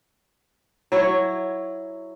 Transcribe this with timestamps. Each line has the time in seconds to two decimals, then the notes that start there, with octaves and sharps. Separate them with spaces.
0.92 F#3 E4 C#5